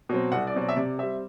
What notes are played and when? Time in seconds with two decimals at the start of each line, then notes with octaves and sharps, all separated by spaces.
0.09 B2 F#3 C4
0.32 C2 F#5
0.47 D5
0.55 B2 F#3 C4
0.62 D5
0.69 E5
0.76 C3 D5
0.98 G3 C4 E5